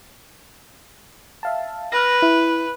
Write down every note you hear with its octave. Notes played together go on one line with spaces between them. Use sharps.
E5 F5 A5
B4 F6 A#6
E4